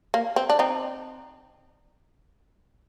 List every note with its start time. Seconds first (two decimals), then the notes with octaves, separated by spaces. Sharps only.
0.14 A#3
0.36 C4
0.50 D4
0.59 C4 D#4